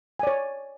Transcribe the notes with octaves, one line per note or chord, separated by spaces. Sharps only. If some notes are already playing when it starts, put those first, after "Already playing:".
C#5 D5 G#5